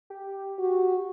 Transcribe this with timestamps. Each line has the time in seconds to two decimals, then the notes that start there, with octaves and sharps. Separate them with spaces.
0.10 G4
0.59 F#4